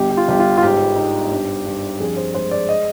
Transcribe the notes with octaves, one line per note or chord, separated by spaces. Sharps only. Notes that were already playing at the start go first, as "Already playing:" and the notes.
Already playing: G1 G4
G4
F4
G1 G4
F4
F4
G#2 G4
D#4
G2
G2
F2 G#4
C5
G#3 C5
D5
D#5